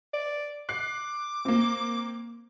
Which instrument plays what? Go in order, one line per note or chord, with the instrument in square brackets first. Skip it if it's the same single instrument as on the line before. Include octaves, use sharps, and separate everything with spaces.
[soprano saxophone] D5
[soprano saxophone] D6 [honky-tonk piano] F#6 C7
[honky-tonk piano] A#3 C4